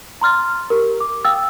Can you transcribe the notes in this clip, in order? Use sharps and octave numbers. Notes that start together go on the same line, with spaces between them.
A#5 C6 F6 A6
G4 A#4
D6
F5 G5 D#6 E6 A6